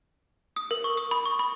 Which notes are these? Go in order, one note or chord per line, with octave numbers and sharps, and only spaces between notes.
D#6
A#4
C#6
D#6
B5
C#6
B5